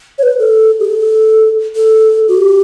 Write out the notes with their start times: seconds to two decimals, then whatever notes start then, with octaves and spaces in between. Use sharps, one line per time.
0.18 C#5
0.23 B4
0.39 A4
0.80 G4
0.85 A4
1.76 A4
2.28 F#4
2.38 G4